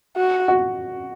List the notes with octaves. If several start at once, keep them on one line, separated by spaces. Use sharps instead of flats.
F#4
F#4